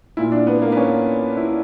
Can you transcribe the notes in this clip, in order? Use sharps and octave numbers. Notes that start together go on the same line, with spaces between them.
A#2 E4
D4
B3
A#3
B3
C#4
E4